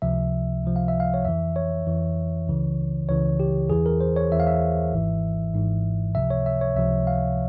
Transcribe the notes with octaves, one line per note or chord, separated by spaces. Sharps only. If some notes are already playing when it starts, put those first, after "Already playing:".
C#2 C3 F3 E5
C#2 C3 F3
F5
E5
F5
C#5
F2 E3 E5
C#5
F2 E3
C#2 C#3 E3
C#2 C#3 E3 C#5
G4
E2 E3 G#4
A#4
C5
C#5
E2 E3 E5
F5
E5
G#1 G#2 E3
G#1 G#2 E3
C#2 C3 F3 E5
C#5
E5
C#5
C#2 C3 F3 E5
F5